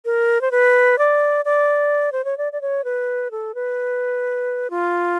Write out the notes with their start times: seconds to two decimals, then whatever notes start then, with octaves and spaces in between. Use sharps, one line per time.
0.05 A#4
0.41 C5
0.51 B4
0.99 D5
1.45 D5
2.12 C5
2.25 C#5
2.38 D5
2.52 D5
2.61 C#5
2.84 B4
3.31 A4
3.55 B4
4.70 F4